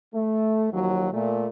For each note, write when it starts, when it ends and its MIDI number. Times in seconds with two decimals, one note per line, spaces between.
0.13 0.70 57
0.72 1.07 39
0.72 1.07 53
0.72 1.07 54
1.13 1.46 46
1.13 1.46 57